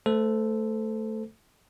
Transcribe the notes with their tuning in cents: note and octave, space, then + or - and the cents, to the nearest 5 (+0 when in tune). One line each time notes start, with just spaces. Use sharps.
A3 +0 A4 +0 C5 -25